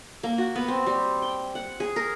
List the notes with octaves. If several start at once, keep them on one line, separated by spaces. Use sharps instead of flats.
A#3
F#4
B3
C4
G3
G5
F#5
G#4
A#4